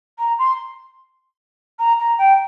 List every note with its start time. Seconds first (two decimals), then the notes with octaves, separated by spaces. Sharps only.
0.18 A#5
0.39 C6
1.79 A#5
1.99 A#5
2.18 G5